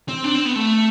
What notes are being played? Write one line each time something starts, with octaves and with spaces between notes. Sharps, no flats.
C4
D4
C4
B3
A3